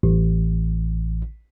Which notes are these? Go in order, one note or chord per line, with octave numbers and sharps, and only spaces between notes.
A1